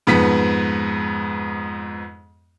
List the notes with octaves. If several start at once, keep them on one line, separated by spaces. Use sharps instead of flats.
F2 G#2 B3 B4 B6